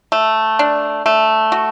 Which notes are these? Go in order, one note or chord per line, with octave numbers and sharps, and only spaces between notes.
A3
D4
A3
F#4